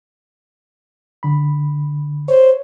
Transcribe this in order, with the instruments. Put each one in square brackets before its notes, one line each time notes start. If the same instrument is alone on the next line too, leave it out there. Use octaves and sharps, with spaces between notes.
[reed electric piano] D3 B5
[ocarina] C5 [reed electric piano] C#5